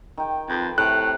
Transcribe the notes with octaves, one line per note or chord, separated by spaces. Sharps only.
D#3 G5
F2 B4
A2 C3 F#6